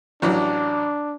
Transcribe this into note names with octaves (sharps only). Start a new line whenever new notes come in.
A1 E3 F#3 D4